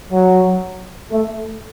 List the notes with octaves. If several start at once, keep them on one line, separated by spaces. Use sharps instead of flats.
F#3
A3